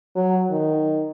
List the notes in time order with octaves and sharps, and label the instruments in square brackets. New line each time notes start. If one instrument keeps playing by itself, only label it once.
[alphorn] F#3
D#3